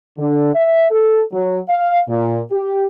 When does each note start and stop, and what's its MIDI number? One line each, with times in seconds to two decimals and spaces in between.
0.18 0.54 50
0.55 0.89 76
0.90 1.22 69
1.32 1.59 54
1.69 2.00 77
2.08 2.40 46
2.52 2.86 67